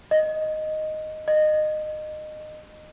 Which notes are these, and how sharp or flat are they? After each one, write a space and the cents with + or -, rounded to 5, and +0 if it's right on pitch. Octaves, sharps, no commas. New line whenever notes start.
D#5 -5
D#5 -20